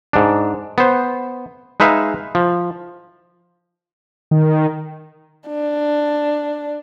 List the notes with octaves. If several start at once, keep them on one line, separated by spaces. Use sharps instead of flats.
G#2 D4
B3 C5
G#3 D#4 B4 E5 F5
F3
D#3
D4